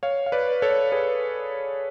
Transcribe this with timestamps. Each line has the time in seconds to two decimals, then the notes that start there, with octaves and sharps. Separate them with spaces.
0.03 C#5 F5
0.26 F5
0.32 B4 D5
0.62 A4 C#5
0.92 G#4 B4